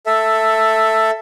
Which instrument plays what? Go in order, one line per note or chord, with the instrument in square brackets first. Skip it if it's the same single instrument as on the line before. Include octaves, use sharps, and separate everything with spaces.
[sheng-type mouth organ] A4 E5